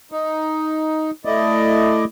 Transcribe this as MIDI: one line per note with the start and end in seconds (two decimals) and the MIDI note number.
0.12 1.11 63
1.25 2.04 57
1.25 2.04 64
1.25 2.04 74
1.25 2.04 75